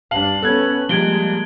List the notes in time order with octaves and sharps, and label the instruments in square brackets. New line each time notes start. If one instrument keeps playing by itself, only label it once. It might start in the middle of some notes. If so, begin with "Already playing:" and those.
[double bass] G2 D4 [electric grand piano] F5 [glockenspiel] A5 F#7
[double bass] B3 C#4 [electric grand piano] A4 F#6 G#6
[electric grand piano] F3 G3 [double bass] G#3 A#3 [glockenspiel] G#6 D7 G7